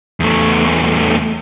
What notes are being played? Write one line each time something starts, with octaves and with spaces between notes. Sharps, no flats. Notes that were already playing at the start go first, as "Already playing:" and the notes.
E2 A3